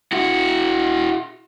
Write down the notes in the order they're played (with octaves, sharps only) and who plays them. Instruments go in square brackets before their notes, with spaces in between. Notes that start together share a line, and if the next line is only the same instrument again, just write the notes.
[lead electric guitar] E4 F#4